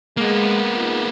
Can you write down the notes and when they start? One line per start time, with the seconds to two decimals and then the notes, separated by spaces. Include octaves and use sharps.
0.17 G#3 A#3 B3
0.77 D#4 F4 G#4